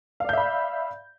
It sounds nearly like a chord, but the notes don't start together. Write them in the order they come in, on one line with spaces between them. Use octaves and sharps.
F5 D5 G6 E5 B5